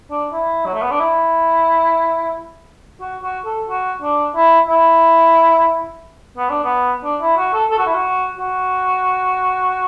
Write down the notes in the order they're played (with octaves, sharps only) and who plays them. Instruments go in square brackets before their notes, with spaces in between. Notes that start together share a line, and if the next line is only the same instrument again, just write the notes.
[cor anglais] D4
E4
F#3
A3
B3
D4
E4
F#4
F#4
A4
F#4
D4
E4
E4
B3
D4
B3
D4
E4
F#4
A4
A4
F#4
E4
F#4
F#4